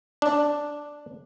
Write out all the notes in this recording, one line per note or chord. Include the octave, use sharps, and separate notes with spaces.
D4